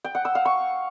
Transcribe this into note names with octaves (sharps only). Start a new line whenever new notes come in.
G5
F#5
E6
F5
C#6